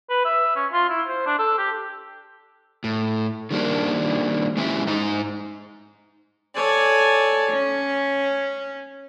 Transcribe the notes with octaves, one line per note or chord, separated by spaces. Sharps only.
B4
E5
C#4
F4
E4
C5
D4
A4
G4
A2
D#3 G3 A#3 D4
G#3 C#4 D4 E4 G4 E5
G#2 D#4 A#5
A4 C#5 D5 G#5
C#4